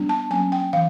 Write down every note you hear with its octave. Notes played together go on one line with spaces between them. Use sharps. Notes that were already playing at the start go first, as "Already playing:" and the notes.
Already playing: G3 B3 D4
A5
F#3 A#3 C#4 G#5
G5
E3 F5